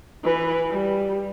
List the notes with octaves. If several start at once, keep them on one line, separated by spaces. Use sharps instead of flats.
E3 B4
G3